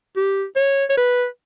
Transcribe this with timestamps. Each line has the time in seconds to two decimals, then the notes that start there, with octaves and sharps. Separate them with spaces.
0.17 G4
0.56 C#5
0.90 C#5
0.97 B4